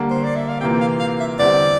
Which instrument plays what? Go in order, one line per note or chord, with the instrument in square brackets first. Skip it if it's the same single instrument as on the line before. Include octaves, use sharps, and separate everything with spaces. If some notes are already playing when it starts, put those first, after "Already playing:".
Already playing: [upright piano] D3 G3 A#3
[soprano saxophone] C5
D5
E5
F5
[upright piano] C3 E3 A#3 F4 [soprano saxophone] G5
[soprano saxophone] F5
F5
E5
[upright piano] E2 D3 G3 C4 [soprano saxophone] D5